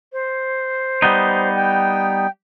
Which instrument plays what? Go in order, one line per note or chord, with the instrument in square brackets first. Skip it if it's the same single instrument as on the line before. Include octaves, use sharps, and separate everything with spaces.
[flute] C5
[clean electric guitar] G3 B3 D#4
[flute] G5